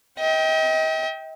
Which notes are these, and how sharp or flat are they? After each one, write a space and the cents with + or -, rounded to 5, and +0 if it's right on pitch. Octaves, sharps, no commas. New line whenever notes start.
D#5 +40 G5 +0